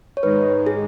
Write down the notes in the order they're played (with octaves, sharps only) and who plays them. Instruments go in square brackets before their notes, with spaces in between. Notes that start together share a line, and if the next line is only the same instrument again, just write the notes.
[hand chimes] C#5
[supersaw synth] G#2 D#3 G#3 D#4 [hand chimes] B4
[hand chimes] G#4